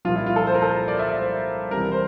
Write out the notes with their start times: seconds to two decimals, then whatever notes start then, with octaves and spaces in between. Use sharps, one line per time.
0.05 F3 F4
0.08 C2 A#2
0.16 E4
0.26 F4
0.36 A4
0.47 C5
0.54 A#4
0.62 A4
0.69 A#4
0.88 D5
0.99 E5
1.09 D5
1.19 C5
1.71 C2 C3 E3 A#4
1.92 C5